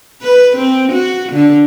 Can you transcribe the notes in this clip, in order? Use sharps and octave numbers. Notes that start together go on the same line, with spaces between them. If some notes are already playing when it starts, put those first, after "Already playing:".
B4
C4
F#4
D3